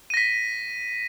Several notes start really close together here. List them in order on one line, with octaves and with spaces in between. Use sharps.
D#7 A#6 B6